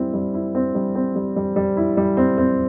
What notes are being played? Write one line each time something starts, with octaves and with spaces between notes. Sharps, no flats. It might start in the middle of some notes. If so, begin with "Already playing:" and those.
Already playing: G3 C4 E4
G3
E4
C4
G3
C4
G3
G3
G3
E4
G3
C4
C4